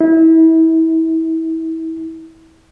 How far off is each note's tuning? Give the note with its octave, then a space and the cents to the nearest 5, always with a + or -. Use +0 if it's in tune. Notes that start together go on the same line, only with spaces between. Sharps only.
E4 -30